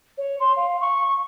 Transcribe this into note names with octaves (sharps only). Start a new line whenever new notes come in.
C#5
C6
F5
C#6